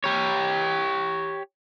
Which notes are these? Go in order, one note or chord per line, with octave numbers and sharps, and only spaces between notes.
G4 C#5